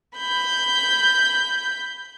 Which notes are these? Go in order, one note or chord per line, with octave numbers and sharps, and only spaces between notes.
B5 G6